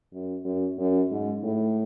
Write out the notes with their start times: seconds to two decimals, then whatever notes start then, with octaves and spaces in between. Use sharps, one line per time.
0.13 F#2
0.45 F#2
0.78 F#2
1.11 G#2
1.43 A2